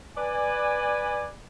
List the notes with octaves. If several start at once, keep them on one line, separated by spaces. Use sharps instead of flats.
B4 D5 G#5